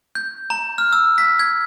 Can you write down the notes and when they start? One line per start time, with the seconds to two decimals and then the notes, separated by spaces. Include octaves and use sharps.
0.15 G6
0.50 A#5
0.78 F6
0.93 E6
1.18 B6
1.39 G#6